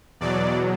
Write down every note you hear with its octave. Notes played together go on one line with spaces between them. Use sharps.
E2 B2 F#3 D5